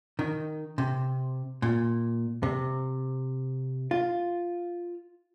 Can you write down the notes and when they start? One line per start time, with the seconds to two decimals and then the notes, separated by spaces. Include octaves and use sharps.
0.19 D#3
0.78 C3
1.62 A#2
2.43 C3
3.91 F4